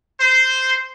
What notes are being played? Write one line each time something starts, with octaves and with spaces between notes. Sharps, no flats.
C5